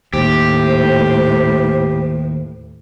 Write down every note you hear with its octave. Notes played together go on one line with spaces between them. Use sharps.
D#2 A2 G4 C5